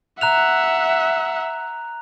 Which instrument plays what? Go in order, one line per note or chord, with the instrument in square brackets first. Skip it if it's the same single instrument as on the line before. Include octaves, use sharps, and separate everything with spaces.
[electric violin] E5 F#5 [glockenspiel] A#5 F#6 F7